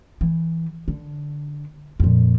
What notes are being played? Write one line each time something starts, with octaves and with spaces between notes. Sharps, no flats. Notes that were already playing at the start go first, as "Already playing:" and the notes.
E3
D3
F2 A#2